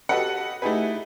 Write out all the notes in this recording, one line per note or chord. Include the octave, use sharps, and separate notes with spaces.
F#4 G4 A4 B4 D#5 F#5
A3 D#4 E4 G4 G#4 B4